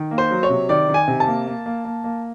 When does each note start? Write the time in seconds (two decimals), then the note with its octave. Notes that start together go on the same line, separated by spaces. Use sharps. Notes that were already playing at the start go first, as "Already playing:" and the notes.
Already playing: D#3
0.11 A#3
0.18 C5
0.31 F#3
0.43 C#5
0.50 C3
0.69 D#3 D5
0.89 D#3
0.94 G#5
1.08 C3
1.20 A5
1.27 A#3
1.47 A#3
1.66 A#3
1.85 A#3
2.04 A#3